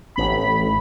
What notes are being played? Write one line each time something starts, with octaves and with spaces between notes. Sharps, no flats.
A1 B5